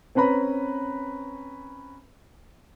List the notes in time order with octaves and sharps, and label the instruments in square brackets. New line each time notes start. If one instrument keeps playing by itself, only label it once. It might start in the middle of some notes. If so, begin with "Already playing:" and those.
[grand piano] C4 C#4 B4 A#5 B5